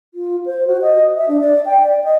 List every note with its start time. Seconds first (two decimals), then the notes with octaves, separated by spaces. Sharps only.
0.14 F4
0.46 C5
0.67 F#4
0.82 D#5
1.16 E5
1.28 D4
1.41 D5
1.66 G5
1.82 D5
2.04 D#5